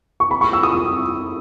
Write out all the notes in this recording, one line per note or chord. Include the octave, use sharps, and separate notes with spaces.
C#6
B5
C#6
E6
D#6